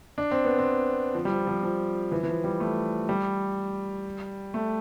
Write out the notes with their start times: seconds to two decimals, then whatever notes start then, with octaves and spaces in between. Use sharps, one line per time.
0.18 D4
0.31 C4
0.45 B3
0.58 C4
1.15 F3
1.25 G3
1.31 F3
1.47 F3
1.63 F3
2.12 E3
2.23 E3
2.28 F3
2.44 G3
2.60 A3
3.09 G3
4.54 A3